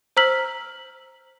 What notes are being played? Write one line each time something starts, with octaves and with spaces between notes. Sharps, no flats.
C5 A#5 E6 F6 B6 F#7